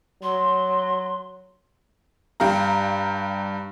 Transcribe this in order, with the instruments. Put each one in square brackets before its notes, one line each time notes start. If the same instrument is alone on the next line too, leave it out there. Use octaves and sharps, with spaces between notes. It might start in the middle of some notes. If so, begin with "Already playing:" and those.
[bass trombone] F#3 [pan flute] C6
[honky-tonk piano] G2 G4 F5 A#5